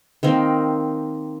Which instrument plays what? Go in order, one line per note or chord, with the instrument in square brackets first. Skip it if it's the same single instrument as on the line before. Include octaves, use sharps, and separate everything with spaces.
[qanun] D#3 A#3 C4